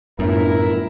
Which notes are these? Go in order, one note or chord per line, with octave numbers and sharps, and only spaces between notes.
G1 F#2 A2 E4 A#4